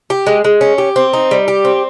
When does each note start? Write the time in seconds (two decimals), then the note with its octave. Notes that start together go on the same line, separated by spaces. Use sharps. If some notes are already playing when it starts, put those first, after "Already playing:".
0.10 G4
0.27 G#3
0.44 G#3
0.61 C#4
0.78 G4
0.96 C4
1.13 D#4
1.31 G3
1.48 G4
1.65 C4